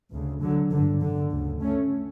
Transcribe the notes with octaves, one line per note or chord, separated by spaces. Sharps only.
D2 C#3
D3 F#3
G1 G2 D3 F#3
D3
D2 C#3
A3 C#4